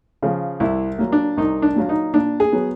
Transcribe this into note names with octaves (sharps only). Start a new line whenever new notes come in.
C#3 F3
C2 E4
A#2 F#3 A#3
D4
C2 D#4
D4
A#2 F#3 A#3
D#4
A#2 D4
G#4
F#3 B3